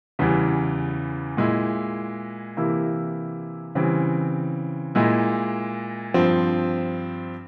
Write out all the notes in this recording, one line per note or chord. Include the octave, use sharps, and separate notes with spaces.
E2 C#3 E3 G3
A#2 G#3 E4
C3 E3 A#3 E4
C#3 E3 G3 C4
A#2 G#3 E4
G2 F3 C4